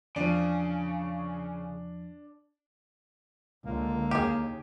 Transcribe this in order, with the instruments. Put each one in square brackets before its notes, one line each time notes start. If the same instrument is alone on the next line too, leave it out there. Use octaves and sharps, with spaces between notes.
[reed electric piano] E2 F3 [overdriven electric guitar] C#3 [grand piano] D4
[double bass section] C#2 D3 [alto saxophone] A#3
[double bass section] D#2 C#3 [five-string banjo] G4 G#4